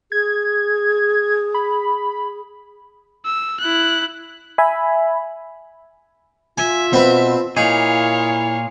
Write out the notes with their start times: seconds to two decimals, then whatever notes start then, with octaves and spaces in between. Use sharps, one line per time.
0.12 G#4 G#6
1.54 B5
3.25 E6
3.60 E4 F#6
4.58 E5 G#5 B5
6.58 F4 E5 G#5
6.93 B2 C4 B4
7.57 A#2 D#4 E4 G#4 C#5 F5